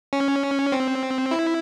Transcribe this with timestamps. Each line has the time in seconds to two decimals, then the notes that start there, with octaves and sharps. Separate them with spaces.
0.13 C#4
0.72 C4
1.31 E4